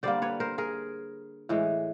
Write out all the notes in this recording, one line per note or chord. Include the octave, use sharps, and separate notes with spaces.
D3 G3 A#3 C5 D5
B4 C#5
A#4 C5
G#4 A#4
A2 E3 G#3